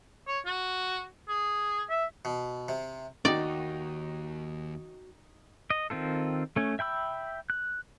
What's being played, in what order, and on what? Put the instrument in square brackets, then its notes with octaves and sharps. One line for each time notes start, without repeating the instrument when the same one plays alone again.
[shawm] C#5
F#4
G#4
E5
[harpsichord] B2
C3
[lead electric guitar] D#2 [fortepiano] D#4 [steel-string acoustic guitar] F#4 G5 [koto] D5
[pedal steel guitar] D#5
D#3 C4 F4 A4
A3 C#4
E5 G5 B5 E6
F#6